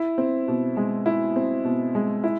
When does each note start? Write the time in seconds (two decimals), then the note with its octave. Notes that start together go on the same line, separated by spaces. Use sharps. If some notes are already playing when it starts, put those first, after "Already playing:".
Already playing: E4
0.18 C4
0.48 B2
0.77 G#3
1.06 E4
1.36 C4
1.65 B2
1.95 G#3
2.24 E4